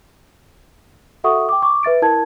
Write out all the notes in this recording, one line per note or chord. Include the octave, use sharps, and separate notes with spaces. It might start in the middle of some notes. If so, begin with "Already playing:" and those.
F#4 A4 E5 F#5 C#6 D#6
G5 D6
C#6 D6
B4 E5 A6 D7
E4 A#4 A5 G#6